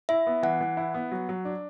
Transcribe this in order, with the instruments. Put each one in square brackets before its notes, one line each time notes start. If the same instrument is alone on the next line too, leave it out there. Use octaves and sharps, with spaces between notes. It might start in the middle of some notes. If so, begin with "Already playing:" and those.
[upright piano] E4 [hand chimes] E5
[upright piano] B3
[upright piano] E3 [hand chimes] F#5
[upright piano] E3
E4
B3
F#3
F#3
D4